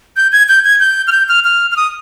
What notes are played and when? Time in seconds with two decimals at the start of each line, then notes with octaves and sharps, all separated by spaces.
0.16 G6
0.32 G#6
0.49 G6
0.65 G#6
0.80 G6
1.07 F6
1.12 G6
1.29 F6
1.44 F6
1.71 F6
1.77 D#6